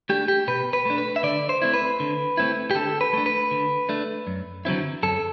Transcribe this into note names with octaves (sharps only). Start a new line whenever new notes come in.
A3 D4 G4
G4
B2 B4
B4
A3 D4
B4
E5
D3 D5
C5
A3 C4 E4
B4
D3
A3 C4 E4
G4
D3 A4
B4
A3 D4
B4
D3
A3 D4
F#2
D3 F#3 C4 E4
F#2 A4